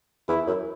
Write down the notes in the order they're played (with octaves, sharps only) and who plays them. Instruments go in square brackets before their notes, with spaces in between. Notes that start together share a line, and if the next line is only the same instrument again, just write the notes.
[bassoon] E2 [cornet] E4
[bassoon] F#2